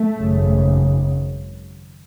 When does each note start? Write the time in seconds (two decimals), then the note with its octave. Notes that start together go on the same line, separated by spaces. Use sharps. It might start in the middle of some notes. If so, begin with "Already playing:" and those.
Already playing: A3
0.16 G#1 F#2 C#3